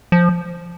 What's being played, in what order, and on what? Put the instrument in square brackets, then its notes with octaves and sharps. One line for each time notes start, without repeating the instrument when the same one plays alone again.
[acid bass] F3